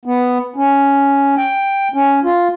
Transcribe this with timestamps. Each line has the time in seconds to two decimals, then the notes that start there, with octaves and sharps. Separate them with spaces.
0.05 B3
0.56 C#4
1.38 G5
1.94 C#4
2.24 F4